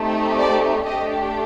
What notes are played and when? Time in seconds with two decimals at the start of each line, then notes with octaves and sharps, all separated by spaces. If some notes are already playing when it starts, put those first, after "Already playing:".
Already playing: A3 C4 D#4 G4
0.39 D5
0.84 A3 D4 G4 D#5